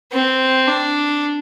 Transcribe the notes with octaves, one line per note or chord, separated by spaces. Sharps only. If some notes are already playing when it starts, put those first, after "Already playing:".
C4
D4